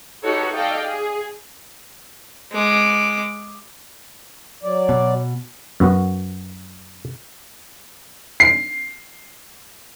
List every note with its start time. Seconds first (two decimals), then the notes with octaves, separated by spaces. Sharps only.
0.22 D#4 F#4 G4 A4 B4 C#5
0.52 A4 D5 D#5 F5 G5
0.83 G#4
2.52 G#3 D6
4.63 F#3 D5
4.89 B2
5.80 F#2 B3 F#4
8.40 C7